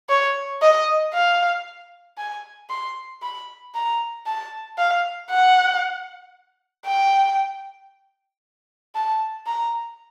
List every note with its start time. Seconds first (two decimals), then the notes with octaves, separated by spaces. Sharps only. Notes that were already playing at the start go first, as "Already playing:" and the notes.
0.10 C#5
0.62 D#5
1.14 F5
2.18 G#5
2.70 C6
3.22 B5
3.75 A#5
4.27 A5
4.78 F5
5.30 F#5
6.86 G5
8.95 A5
9.47 A#5